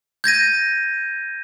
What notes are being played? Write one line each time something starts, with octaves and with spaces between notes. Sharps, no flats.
G6 G#6 A#6 D#7